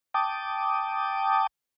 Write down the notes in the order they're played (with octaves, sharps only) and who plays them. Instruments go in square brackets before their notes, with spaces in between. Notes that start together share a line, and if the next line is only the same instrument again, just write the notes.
[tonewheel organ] G5 A5 D6 D#6